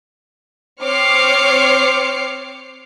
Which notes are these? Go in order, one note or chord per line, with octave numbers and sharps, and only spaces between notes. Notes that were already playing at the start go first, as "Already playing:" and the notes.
C4 C#5 D6 F6 C7 C#7